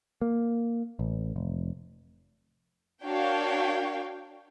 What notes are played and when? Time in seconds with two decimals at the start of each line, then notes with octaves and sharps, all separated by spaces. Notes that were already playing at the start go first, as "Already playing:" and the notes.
0.22 A#3
0.99 A1
1.36 F1
3.04 D4 F#4 A#4 C#5 F5 G5